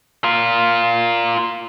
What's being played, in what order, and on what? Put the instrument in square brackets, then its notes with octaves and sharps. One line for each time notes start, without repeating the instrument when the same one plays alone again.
[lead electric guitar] F4 A#4